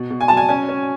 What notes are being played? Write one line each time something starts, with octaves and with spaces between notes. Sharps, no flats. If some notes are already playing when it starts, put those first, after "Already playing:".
Already playing: B2
B2
G#5
F#3 A5
G#5
C#4 G#5
C#4